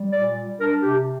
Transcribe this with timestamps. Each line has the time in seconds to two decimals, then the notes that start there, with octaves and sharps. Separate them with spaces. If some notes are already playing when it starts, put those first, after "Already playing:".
Already playing: G3
0.12 A#2 D5
0.36 G3
0.59 D4 A#4
0.82 C3 G4